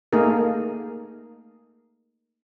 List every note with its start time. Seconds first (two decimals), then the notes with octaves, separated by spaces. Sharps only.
0.13 A3 A#3 D#4 G#4 A#4